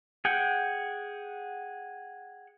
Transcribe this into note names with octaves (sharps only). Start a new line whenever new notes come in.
G#4 F#5 G5